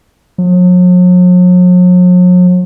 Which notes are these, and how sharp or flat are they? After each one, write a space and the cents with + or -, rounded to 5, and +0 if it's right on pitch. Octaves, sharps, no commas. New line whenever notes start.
F#3 -45